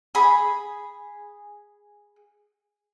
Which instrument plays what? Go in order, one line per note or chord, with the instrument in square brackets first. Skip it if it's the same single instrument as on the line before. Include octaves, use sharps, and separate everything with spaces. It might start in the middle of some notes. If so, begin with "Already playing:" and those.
[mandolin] G#4 B5